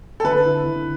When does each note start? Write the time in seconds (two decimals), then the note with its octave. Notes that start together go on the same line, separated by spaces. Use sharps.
0.20 A4
0.24 D3 B4
0.45 E4
0.65 D3